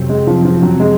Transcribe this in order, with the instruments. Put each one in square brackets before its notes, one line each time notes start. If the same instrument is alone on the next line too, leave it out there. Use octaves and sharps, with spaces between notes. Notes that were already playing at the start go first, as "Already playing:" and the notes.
Already playing: [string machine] F2 C3 F#3 C4
[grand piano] G#3
F3
F3
F#3
G#3